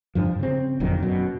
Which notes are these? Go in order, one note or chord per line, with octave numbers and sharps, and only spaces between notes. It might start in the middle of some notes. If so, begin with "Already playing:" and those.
G2 F3
C#3 C4
F#1 F2 A#2 D#3
F#2 B2